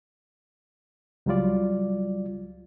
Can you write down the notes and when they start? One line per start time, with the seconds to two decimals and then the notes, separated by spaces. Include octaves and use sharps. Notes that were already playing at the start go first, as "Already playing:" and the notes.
1.26 C#2 F#3 G3 F4 D5